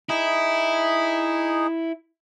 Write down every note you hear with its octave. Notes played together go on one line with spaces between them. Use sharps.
D#4 E4 G#4